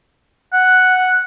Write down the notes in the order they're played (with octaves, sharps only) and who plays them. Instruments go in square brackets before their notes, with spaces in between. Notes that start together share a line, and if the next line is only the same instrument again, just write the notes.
[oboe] F#5